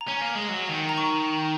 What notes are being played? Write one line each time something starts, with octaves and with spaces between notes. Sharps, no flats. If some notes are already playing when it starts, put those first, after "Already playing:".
A#5
C#4 G#5
A#3
G#3
F#3
D#3
A#5
C#6
A#5